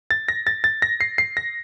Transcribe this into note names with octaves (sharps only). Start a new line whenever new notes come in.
A6
A#6
A6
A6
A#6
C7
C7
A#6